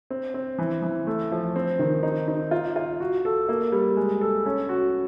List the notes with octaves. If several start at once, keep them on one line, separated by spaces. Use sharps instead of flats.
C4
C4
E3
E3
A3
F3
C4
D#3
D#4
D#4
F4
F4
F#4
A4
A#3
G3
G#3
A4
C#4
F#4